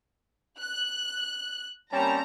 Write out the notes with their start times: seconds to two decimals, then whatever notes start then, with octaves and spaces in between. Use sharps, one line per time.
0.60 F#6
1.93 G3 A#3 C4 C#4 G5 A5 A#5